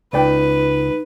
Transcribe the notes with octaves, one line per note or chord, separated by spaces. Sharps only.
C#2 D#4 B4 D5 G5